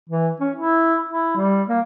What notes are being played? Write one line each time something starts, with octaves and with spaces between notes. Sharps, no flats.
E3
C#4
E4
E4
G3
A#3